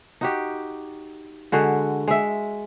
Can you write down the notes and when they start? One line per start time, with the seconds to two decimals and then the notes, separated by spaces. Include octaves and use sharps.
0.21 D#4 F#4 G4
1.52 D3 G#3 F#4
2.08 G#3 E5